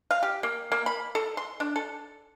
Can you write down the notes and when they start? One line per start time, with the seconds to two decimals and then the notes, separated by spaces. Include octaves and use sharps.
0.11 F5
0.23 G4
0.43 A#3
0.72 A#3
0.86 B5
1.15 A4
1.37 C6
1.60 D4
1.76 A4